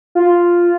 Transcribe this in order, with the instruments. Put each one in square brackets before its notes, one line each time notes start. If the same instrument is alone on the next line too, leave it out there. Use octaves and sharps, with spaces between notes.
[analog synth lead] F4